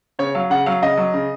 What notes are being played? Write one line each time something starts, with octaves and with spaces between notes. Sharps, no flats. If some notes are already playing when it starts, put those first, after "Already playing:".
C#3 C#5
F#3 F5
C#3 F#5
F#3 F5
C#3 D#5
F#3
C#3